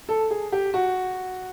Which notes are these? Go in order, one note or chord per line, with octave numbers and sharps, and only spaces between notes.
A4
G#4
G4
F#4